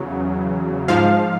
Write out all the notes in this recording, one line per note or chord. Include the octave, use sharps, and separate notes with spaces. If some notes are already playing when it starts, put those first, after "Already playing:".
Already playing: E2 C#3 F#3
G#2 F3 F5